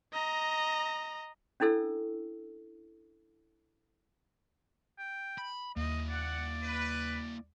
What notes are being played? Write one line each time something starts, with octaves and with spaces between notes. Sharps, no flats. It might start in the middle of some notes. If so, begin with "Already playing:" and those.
D#5 A#5
C#4 D4 E4 A4 E6
G5
B5
D#2 A#3 E4 D#5
D5 F#5
B4